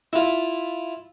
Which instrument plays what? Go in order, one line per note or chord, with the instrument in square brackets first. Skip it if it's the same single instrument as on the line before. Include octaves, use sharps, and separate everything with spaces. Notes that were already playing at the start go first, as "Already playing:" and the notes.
[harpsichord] E4 F4